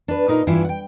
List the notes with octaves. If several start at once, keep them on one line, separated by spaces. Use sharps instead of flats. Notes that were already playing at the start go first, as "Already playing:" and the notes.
D4 B4
A#2 D#4 A#4 D#5
G2 E3 E4 F4 E5 G#5
F#5 G5